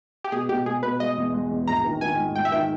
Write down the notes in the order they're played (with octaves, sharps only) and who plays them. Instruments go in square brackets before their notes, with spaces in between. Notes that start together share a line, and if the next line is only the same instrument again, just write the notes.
[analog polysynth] G4
[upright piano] B2 [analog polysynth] G#4
[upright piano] B2 [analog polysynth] G4
[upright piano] B2 [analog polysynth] G#4
[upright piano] B2 [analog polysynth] B4
[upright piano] G#3 [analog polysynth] D#5
[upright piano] E2
G#3
E2
[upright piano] A#1 [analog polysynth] A#5
[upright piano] D#3
[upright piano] D#3 [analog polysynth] G#5
[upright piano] G#2
[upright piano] G#2 [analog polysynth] G5
[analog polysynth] E5
[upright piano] D#3 [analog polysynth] G5